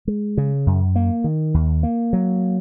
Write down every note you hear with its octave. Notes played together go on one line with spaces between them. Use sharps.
G#3
C#3
F#2
A#3
D#3
D#2
A#3
F#3